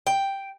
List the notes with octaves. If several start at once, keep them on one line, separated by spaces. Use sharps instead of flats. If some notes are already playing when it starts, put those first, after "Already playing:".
G5